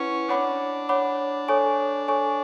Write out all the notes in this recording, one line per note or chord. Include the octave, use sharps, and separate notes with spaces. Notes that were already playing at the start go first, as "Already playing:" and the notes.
Already playing: C#4 E4 B4 F#5
D4 C#5 F#5 B5 D6
C#5 F#5 B5 D6
A4 C#5 G#5 C#6
A4 C#5 G#5 C#6